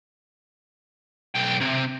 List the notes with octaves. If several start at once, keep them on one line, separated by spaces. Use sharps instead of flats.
B1 G5
C3